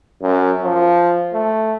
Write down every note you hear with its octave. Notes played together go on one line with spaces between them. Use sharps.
F#2
F3
A3